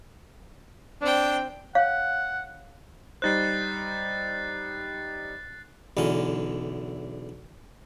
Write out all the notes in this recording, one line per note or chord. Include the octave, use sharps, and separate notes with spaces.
C4 D4 G5
C#5 F5 F#5
G3 D#4 C5 F#6 A6 C7
B1 E2 D3 C#4